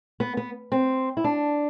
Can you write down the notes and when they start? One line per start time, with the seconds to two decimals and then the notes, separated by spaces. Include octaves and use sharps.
0.20 B3
0.37 B3
0.72 C4
1.17 E4
1.24 D4